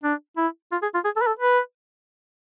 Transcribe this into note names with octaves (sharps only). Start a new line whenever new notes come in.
D4
E4
F4
G#4
F4
G#4
A4
B4
A4
B4